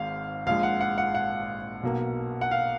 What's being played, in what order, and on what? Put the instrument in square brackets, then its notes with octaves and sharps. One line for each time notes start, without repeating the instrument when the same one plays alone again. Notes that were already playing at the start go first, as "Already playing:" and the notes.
Already playing: [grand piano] G#1 G#2 G#3 F5
A#1 A#2 G#3 F5
F#5
F#5
F#5
F#5
B1 B2 A#3
F#5
F5